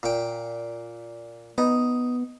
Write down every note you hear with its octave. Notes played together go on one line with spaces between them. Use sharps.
A#2 G5
B3 D#4